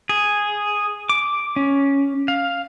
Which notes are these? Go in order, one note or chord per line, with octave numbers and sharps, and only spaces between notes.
G#4
D6
C#4
F5